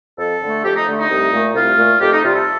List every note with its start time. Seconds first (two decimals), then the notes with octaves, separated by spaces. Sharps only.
0.18 F2 A4
0.41 D3 A3
0.64 F2 G4
0.75 D#4
0.87 D3 A3
0.98 D#4
1.09 C2
1.32 A#2 A3
1.54 C2 F4
1.77 A#2 A3
2.00 F2 G4
2.12 D#4
2.23 C3 G3 F4
2.34 A4